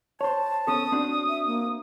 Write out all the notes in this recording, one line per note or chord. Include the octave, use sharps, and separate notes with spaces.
C5 C#5 A5
B3 C#4 A4 D#6
C4 D4 F#4
E5
A#3